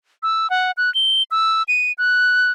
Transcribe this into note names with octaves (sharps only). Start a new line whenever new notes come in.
E6
F#5
F#6
G7
E6
D#7
F#6